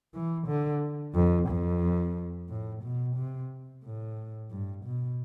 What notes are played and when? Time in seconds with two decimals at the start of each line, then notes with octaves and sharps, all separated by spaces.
0.14 E3
0.47 D3
1.15 F2
1.48 F2
2.49 A2
2.83 B2
3.16 C3
3.84 A2
4.51 G2
4.85 B2